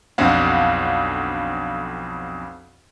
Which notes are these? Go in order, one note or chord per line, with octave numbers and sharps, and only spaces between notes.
B1 F2 C4 D4 F5 F#5